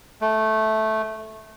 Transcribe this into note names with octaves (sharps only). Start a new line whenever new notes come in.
A3